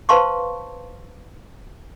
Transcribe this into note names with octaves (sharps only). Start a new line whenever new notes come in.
B4 C5 F5 A5 C6 C#6